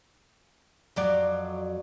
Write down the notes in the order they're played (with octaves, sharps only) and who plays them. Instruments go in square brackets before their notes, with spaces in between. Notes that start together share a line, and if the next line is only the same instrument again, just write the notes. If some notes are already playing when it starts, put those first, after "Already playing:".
[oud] F2 F#3 D5